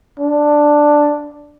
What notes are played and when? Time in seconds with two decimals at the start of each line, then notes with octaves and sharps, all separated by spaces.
0.20 D4